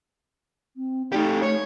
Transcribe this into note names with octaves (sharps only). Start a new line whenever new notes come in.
C4
A3 D#4 G4
A3 C#5